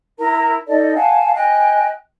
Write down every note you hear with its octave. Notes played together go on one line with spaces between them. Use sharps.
E4 A#4 A#5
D#4 A4 D5 D#5
F5 F#5 G#5 A5
D#5 G5 G#5 F#6